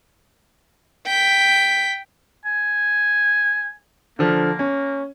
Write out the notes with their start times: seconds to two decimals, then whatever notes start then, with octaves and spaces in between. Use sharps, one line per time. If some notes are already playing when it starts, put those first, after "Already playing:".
1.06 G5 B6
2.45 G#5
4.19 D3 F3 A#3
4.59 C#4